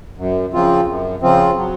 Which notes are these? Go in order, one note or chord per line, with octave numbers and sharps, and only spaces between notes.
F#2
C#3 F3 C4 F4
F#2
C#3 F3 C4 F4
F#3